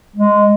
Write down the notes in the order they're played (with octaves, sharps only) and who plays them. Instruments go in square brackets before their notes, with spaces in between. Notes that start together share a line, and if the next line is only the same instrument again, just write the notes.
[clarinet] G#3